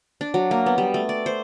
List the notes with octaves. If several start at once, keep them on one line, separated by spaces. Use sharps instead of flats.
D4
F#3
A#3
B3
G3
A3
D5
C5